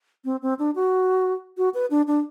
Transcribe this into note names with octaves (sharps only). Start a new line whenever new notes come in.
C4
C4
D4
F#4
F#4
B4
D4
D4